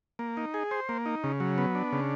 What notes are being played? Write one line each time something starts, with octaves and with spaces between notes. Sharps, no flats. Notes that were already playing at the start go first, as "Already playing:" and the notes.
A#3
D#4
G#4
C5
A#3
D#4
C#3
F#3
B3
D4
C#3